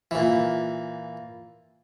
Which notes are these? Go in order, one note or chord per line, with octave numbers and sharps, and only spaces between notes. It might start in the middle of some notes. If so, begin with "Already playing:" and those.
A#2 E3